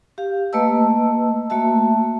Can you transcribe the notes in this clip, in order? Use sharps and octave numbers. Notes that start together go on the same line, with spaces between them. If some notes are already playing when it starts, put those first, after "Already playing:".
G4 F5
A3 A#3 B4 D#5 A5 E6
A3 A#3 F#4 E5 A5